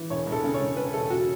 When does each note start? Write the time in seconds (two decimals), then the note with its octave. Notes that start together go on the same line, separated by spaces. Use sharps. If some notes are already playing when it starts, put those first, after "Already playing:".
Already playing: E3
0.10 E1 C#5
0.26 E1
0.32 A4
0.43 C#3
0.54 C#5
0.60 E1
0.77 E1 B4
0.94 E1 A4
1.10 F#4